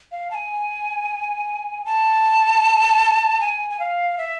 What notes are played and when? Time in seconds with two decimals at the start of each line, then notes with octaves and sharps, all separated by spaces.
0.12 F5
0.31 A5
0.35 G#5
1.85 A5
3.40 G#5
3.70 G#5
3.79 F5
4.18 E5